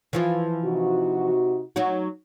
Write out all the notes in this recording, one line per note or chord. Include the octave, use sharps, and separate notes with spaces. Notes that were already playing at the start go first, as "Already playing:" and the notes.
E3 F3 F4
C3 D#4 F#4
F#3 D#4 F#4